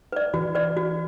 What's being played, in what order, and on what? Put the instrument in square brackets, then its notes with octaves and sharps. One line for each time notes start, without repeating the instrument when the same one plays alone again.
[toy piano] B4 D5
[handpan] E3 [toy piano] F#4
[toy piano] B4 D5
F#4